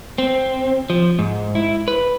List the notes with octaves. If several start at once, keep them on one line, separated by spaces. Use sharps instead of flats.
C4
F3
G#2
E4
B4